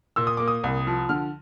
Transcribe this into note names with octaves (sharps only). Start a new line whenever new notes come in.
A#2 E6
D#6
A#3 D6
D#6
C2
F3
D3 F6